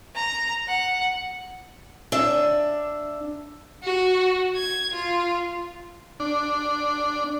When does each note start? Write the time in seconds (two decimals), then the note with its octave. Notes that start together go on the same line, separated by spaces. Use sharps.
0.15 A#5
0.68 F#5
2.12 D4 E5
3.83 F#4
4.56 G#6
4.94 F4
6.20 D4